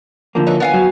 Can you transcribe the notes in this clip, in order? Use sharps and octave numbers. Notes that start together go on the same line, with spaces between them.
D3 F3 A#3
E3 C#4 D#4
B3 F5 G#5
F#3